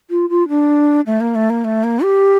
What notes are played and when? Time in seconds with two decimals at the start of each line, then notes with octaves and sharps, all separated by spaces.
0.10 F4
0.30 F4
0.49 D4
1.06 A3
1.21 A#3
1.35 A3
1.50 A#3
1.65 A3
1.84 A#3
2.03 G4